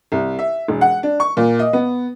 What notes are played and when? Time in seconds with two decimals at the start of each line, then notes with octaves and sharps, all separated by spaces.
0.12 C2
0.39 E5
0.68 E1
0.81 F#5
1.03 D4
1.20 C#6
1.37 A#2
1.59 D#5
1.73 B3